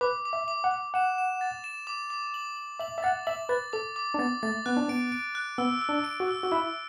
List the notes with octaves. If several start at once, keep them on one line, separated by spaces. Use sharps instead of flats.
B4 D6
D6
E5
D6
F#5
D6
F#5 E7
E7
A6
E7
D6
D6
F#7
F#7
E5 F#7
E5
F#5 A6
E5 F#7
B4 A6
A4 D6
D6
D4
B3 A6
A3 A6
B3 F#6
D4
B3 D7
D7
F#6
B3 E6
E6
D4
D7
F#4
E6
F#4
E4 E6